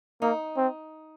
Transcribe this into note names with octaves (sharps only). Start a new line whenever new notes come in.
A#3 D#4
C4